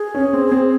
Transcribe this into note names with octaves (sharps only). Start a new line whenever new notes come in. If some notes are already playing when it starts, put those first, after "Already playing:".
Already playing: G#4
C#4
C4
C4